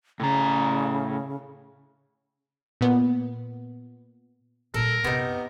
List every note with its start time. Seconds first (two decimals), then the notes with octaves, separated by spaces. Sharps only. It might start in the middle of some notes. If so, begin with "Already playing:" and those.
0.20 A2 C#3 A#5
2.81 A#2 B3
4.74 A#2 G3 A4 A#4
5.04 F#2 C3 B3 D#4 E4